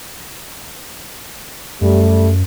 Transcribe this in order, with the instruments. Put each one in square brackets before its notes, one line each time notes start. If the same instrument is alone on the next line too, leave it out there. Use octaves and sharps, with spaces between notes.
[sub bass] F#2 [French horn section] G3 A3